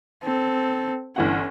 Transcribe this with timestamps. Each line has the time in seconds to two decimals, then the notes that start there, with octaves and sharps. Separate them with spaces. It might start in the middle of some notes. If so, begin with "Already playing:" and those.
0.23 C4 A4
1.16 G1 E3 C#4 F#5